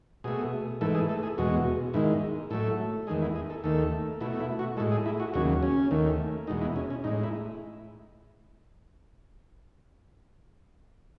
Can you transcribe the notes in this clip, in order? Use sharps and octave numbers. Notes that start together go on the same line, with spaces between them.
B2 A3 G#4
G#2 E3 A3 A4
G#4
A4
G#4
E2 B2 G#3 F#4
G#2 D#3 G#3 E4
A2 F#3 A3 A4
E2 D#3 G#3 G#4
E4
G#4
A4
D#2 D#3 A3 A4
B2 A3 E4
E4
F#4
A2 G#3 A4
G#4
E4
F#4
D#2 C#3 F#3 F#4
C#4
D#2 D#3 A3
E2 B2 G#3 D#4
E4
C#4
C#4
A2 G#3 D#4
E4